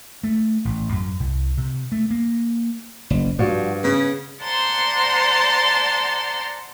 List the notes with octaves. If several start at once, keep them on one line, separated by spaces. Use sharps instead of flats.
A3
A1
F#2
C2
C3
A3
A#3
F#1
G2 F3 G3 F#4
C#3 B3
C5 D5 F#5 A5 A#5 C6